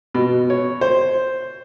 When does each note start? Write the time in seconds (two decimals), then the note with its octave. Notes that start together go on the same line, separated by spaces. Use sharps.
0.14 B2
0.50 C#5
0.81 C5